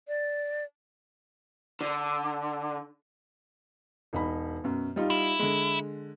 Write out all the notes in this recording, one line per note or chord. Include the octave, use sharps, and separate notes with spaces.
D5
D3
E1 D#4 B5
F#2 B2
G3 D#4 F4
E4
D3 G#3